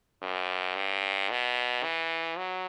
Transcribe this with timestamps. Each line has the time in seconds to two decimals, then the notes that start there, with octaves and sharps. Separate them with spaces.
0.23 F#2
0.76 G2
1.30 B2
1.84 E3
2.38 F#3